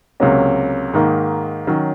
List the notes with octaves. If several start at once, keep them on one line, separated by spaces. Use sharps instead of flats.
C#2 C3 F#3 A#3 C#4
G#2 D#3 A#3
D#3 F#3 C#4